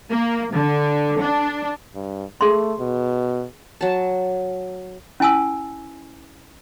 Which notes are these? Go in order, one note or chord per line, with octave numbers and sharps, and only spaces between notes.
A#3
D3
D4
G2
A3 G#4 C6
B2
F#3 A5
C#4 E4 G#5 A5 E6